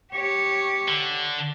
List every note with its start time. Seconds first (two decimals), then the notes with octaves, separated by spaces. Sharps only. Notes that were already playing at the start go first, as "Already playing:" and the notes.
0.12 G4 C#5
0.88 D3